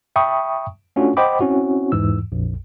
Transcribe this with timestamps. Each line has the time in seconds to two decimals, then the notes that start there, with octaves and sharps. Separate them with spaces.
0.16 E5 G5 A5 B5 C#6 D#6
0.96 A3 C#4 D4 F4 F#4
1.17 C5 D#5 F#5 G5 B5 D6
1.40 C4 C#4 E4 F#4
1.92 E2 G#2 E3 E6
2.32 A#1 F2